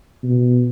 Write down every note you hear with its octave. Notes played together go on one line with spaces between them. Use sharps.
B2